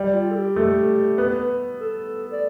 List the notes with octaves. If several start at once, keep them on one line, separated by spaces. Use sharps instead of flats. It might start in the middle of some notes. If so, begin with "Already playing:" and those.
Already playing: G3
F4
A4
G4
A3
B3
A4
D5